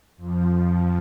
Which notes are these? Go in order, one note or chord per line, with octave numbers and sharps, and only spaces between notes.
F2 F3